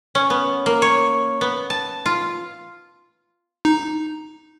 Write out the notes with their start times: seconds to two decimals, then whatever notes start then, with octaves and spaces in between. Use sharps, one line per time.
0.15 C#4
0.30 B3
0.66 A#3
0.82 C#5
1.41 B3
1.70 A5
2.06 F4
3.65 D#4